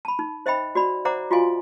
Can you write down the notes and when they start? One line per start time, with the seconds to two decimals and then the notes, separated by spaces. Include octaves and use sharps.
0.05 A5 B5
0.19 D#4
0.46 C5 D#5 E5 G5 B5
0.75 F#4 D5 B5
1.05 C5 D5 E5 F#5 A#5 D6
1.31 F4 F#4 D#5 F5 G#5 C6